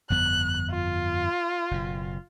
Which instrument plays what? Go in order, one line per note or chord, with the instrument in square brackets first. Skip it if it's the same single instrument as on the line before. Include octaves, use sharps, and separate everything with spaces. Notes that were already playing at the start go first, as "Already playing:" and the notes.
[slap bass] G1 F2 B3 [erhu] F#6
[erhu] F4
[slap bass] F#1 B2